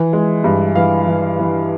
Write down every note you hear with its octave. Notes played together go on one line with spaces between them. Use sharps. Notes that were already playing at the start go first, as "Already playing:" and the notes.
Already playing: E3
G#3
G2
E3 F5
E3
E3